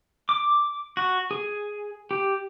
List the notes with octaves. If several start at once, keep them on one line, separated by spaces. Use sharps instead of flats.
D6
F#4
G#4
G4